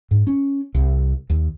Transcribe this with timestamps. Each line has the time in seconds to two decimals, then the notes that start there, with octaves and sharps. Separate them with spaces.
0.11 G#2
0.27 C#4
0.75 C2
1.30 D#2